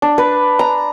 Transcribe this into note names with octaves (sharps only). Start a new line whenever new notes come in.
D4
B4
A#5